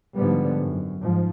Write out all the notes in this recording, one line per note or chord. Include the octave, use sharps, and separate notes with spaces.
G#2 D3 F3 G3 B3
F#2
G#2 F3